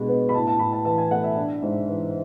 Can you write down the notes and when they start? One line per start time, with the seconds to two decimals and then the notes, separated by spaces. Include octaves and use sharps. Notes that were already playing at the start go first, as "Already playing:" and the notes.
Already playing: B2 G#3 D4 B5
0.08 B3
0.29 B5
0.34 A2 A5
0.47 A5
0.59 A2 B5
0.73 A5
0.85 E3 A5
0.98 G#5
1.10 A3 F#5
1.24 E5
1.36 D4
1.62 G#2
1.88 E3